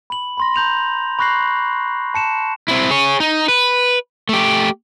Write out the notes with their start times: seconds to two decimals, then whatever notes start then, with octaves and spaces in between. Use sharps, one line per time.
0.10 B5 F#7
0.37 B5 C6 A#6
0.54 A#5 G6 F7 F#7
1.19 B5 C#6 F#6 A#6 C7 F#7
2.14 A5 C#7 E7
2.68 C4 E4
2.90 G#4 C#5
3.20 D#4
3.48 B4
4.29 A3 G4